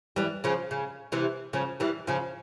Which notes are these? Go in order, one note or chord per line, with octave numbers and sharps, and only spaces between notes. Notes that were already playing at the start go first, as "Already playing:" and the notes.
E3 G3
C#3 F3
C#3
C3 E3
C#3 F3
E3 G3
C#3 F3